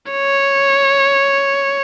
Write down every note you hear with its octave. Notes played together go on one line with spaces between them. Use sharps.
C#5